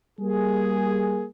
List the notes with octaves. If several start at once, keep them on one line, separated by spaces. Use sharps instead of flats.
G3 A#3 G#4